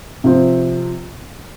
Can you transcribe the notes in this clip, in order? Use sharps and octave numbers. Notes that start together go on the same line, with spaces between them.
C3 F3 C4